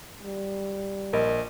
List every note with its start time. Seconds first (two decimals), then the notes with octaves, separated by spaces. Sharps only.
0.24 G3
1.13 A#1 A#4 D#5